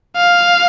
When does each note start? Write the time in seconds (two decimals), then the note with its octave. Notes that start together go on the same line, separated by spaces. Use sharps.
0.17 F5